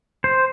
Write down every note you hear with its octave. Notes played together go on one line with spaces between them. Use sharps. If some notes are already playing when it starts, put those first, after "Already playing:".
C5